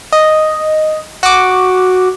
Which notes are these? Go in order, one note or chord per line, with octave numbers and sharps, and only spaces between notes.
D#5
F#4 D6